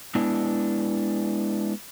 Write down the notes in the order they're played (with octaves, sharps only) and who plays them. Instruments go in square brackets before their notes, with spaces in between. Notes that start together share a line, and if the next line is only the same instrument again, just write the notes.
[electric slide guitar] G#3 B3 D4 E4